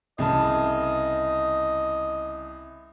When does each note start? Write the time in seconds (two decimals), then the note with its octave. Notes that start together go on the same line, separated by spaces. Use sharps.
0.18 C2 C#3 D#5 A5